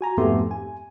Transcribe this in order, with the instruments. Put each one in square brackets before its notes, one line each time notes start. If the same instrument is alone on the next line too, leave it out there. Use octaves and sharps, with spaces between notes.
[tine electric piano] F#4 G#5 A#5
F2 G#2 A3 B3 G4 C6
G#5